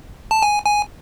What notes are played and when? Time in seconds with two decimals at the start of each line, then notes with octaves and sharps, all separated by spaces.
0.31 A5
0.43 G#5
0.66 G#5